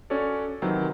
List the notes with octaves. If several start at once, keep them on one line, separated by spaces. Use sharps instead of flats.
C#4 D4 F#4 A4 C#5 D5
C3 D#3 E3 F#3 C4